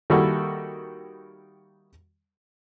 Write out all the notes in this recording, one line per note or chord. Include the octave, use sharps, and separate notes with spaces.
D#3 G3 A#3 E4 F#4 A4